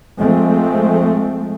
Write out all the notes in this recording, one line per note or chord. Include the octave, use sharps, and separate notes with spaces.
F3 G#3 A3 C4